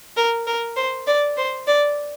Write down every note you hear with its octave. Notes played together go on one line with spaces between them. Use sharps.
A#4
A#4
C5
D5
C5
D5